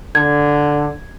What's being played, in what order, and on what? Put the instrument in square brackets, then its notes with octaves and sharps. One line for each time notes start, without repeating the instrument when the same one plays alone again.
[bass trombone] D3 [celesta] G#6